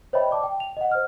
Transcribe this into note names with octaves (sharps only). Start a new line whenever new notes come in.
C5 C#5 D#5 E5 G5 B5
D5 A5 D6
G5
F7
D#5 F#5
C5 F6